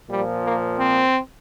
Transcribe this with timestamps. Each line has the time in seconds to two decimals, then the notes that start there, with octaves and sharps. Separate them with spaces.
0.10 A#2 F3 G3
0.45 A#3
0.79 C4